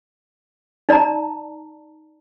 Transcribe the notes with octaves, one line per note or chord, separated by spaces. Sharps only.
D#4 D5 A5 A#5